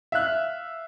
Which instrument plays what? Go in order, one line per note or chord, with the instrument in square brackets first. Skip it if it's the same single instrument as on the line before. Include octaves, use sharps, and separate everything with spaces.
[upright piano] E5 F5 F#6